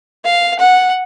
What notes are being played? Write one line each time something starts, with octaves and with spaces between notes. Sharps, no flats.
F5
F#5